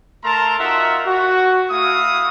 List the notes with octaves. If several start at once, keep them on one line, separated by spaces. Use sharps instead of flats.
A3 A#4 A5 A#5 C6
D#4 F4 F#4 A#4 E5 F#5
F#4
A3 E4 F#4 F5 D#6